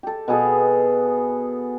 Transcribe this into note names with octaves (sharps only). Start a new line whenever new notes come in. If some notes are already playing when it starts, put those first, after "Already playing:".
G4 A4
B2 B3 G#4 A4